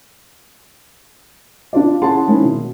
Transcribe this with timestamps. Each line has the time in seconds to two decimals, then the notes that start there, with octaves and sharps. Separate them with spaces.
1.73 D4 F4 D5
2.02 C#4 E4 G#4 F#5 A5 C6
2.27 D#3 G#3 A#3 C4 C#4 E4
2.44 B2